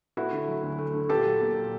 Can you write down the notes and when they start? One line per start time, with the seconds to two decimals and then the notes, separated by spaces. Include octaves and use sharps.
0.17 A3 E4 F#4
0.32 D3
0.48 F#3
0.63 D2
0.78 A3
0.94 D3
1.09 A#2 G4 A4
1.25 F#3
1.40 A#3
1.56 A#2